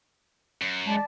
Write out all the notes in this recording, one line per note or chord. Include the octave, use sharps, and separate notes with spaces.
F#2
G#3 D5 A5